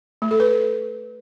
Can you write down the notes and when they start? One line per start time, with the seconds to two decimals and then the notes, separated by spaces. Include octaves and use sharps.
0.22 A3
0.31 A4
0.40 B4